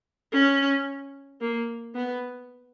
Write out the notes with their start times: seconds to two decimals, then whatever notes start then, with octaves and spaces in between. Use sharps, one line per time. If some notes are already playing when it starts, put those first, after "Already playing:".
0.33 C#4
1.41 A#3
1.95 B3